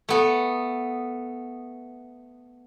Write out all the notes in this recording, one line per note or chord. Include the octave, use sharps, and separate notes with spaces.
A3 B3